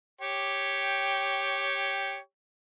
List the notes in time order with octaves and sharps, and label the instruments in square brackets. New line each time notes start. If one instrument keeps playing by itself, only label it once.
[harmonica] G4 C#5 G5